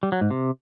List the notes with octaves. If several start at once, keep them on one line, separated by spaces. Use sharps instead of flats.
G3
F#3
G#2
C3